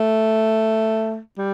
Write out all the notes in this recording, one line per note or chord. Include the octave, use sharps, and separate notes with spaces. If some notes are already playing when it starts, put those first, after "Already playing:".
Already playing: A3
G3